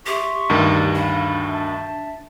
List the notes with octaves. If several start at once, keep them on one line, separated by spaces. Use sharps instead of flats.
G4 E5 C6 C#6
D2 G2 D#3
D4 F5 B5
E5 A5